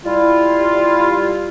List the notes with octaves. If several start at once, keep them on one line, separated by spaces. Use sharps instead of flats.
G3 E4 F4